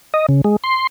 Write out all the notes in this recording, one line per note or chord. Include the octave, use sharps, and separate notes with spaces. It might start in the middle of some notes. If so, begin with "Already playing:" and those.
D#5
C#3
G#3
C6